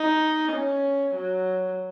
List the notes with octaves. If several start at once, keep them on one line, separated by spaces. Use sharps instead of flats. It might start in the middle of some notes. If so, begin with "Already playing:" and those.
Already playing: D#4
C#4
F#3